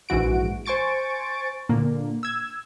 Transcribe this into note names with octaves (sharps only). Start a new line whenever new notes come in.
A#1 G#2 E3 F#4 D7
C5 G#5 C#6 A6 D7
A#2 D3 A#3
E6 G#6